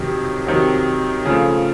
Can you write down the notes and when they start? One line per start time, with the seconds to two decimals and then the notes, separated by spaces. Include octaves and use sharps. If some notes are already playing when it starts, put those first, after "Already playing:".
Already playing: F2 C3 D#3 F#3
0.47 F2 C3 D#3 F#3
1.25 C#3 F3 A3